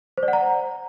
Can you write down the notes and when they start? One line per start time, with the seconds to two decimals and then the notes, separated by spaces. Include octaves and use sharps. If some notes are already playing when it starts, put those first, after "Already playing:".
0.18 C5
0.23 D5
0.28 F#5
0.33 A#5